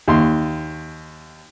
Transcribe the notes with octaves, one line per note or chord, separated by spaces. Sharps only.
D#2 C6